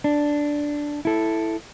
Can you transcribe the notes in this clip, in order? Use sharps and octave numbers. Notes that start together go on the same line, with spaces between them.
D4
E4 A4